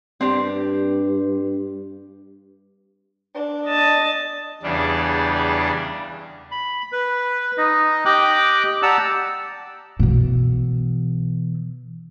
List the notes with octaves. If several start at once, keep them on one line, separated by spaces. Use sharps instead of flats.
G2 C4 D4 G4
D4
D#5 A5
E2 C#3 G3 D4
B5
B4
D#4 D#5
G4 D#5 G5 D6 F#6
G4 D5 F#5 A5 A#5 E6
B2 E3